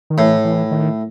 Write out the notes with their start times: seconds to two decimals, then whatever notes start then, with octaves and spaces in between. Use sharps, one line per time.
0.10 D#3
0.18 A2 E3
0.45 E3
0.71 D#3